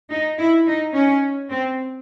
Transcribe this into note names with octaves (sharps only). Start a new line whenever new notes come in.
D#4
E4
D#4
C#4
C4